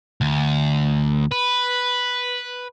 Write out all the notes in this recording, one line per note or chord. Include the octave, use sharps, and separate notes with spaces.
D2
B4